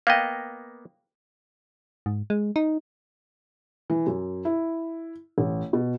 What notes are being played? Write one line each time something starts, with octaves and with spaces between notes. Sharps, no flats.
A#3 B3 D#5 F5 G5
G#2
G#3
D#4
E3
F#2
E4
A1
B2